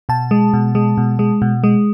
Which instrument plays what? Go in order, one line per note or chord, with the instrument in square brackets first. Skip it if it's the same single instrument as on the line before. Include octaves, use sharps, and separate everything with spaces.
[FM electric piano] B2 A5
G#3
B2
G#3
B2
G#3
B2
G#3